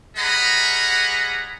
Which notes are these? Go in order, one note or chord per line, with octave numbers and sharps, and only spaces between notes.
G3 G#4 D#5 F#5 A#5 B5